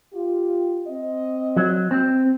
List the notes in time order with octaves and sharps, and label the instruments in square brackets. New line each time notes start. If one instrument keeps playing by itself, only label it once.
[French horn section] F4 G4
C4 D#5
[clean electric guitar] F#3
C4